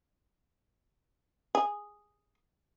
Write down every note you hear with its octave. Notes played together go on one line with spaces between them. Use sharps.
G#4